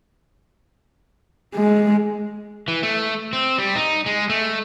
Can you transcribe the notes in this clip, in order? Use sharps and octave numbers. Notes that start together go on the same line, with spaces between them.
G#3
E3
A3
C4
G3
D#4
G#3
A3